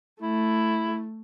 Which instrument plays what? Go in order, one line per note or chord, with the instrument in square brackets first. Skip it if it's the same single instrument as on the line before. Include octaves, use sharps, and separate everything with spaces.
[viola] A3 [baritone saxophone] E4